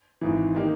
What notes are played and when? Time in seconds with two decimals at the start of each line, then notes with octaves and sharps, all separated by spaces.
0.21 G#1 G#2 E3
0.55 D#3 A#3 D#4 G4